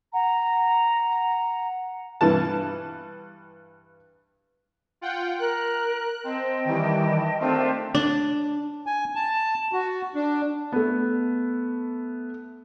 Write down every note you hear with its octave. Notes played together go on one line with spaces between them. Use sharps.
F#5 A#5
G2 E3 A5
F4 F#5 G5
A#4 F#6
C4 D#5 G5 A5
D#3 E3 G3
D#3 A3 C4 D4 F4 G4
D4
G#5
A5
F#4
D4
A3 B3